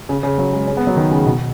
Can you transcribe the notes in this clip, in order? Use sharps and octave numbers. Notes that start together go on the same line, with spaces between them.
C#3
C#3
F#3
G#3
C#4
G#3
B3
F#3
D#3
C#3
B2